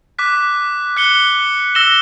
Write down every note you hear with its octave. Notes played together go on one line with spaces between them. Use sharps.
D6 F#6 B6
F#6 C#7 G7
E6 A#6 E7 G7